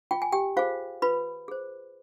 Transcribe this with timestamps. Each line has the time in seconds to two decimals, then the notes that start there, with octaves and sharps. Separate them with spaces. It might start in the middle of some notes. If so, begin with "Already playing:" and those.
0.11 F4 G5
0.22 G#5
0.33 G4 G5
0.57 F4 G#4 C5 F5
1.02 F4 B4 B5
1.48 G#4 C5